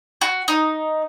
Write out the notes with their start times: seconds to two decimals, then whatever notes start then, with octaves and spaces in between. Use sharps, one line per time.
0.21 F#4
0.48 D#4